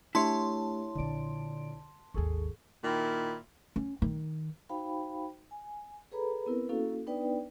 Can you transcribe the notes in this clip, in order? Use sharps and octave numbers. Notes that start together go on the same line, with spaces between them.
A3 D4 E4 G4 C#5 A5 C6
A#1 D3 F4 D5 D7
G#1 D#2 G#4 A4 C#6
A#2 D#3 E4
C#4
D#3
D#4 F#4 C5 F5 G5 B5
G#5
G#4 A4 B4 C#5 A#5 B5
B3 C4 E4 A#4 B4
A#3 C#4 E4 F#4 A4 F5
B3 D4 D#4 B4 D5 G5